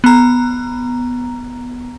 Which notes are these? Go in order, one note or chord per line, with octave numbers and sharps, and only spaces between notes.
B3 A#5